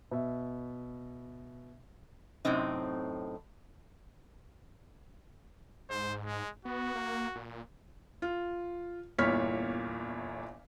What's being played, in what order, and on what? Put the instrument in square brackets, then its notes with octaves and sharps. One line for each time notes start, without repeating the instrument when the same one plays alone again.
[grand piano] B2 E5
[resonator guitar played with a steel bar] F#2 A2 C3 C4 D#4
[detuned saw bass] G#2 [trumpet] C5
[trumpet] G#3
[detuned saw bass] B3 [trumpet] F#4
[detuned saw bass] A#3
A#2
[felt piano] F4
G1 E2 A#2 C#5 F6 B6